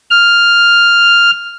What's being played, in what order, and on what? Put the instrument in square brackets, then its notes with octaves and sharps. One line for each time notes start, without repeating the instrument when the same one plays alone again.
[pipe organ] F6